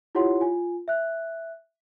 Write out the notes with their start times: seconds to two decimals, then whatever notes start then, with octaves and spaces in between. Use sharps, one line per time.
0.15 E4 F4 G4 C#5 F#5 C6
0.41 F4 G#5
0.88 E5 F#6